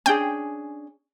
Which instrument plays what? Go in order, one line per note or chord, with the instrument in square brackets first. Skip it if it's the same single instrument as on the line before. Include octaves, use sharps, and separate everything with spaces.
[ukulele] C#4 D4 G#4 [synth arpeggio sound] G5